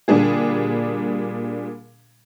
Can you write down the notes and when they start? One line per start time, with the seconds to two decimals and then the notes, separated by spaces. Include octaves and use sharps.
0.08 A#2 D3 G3 D4 G#4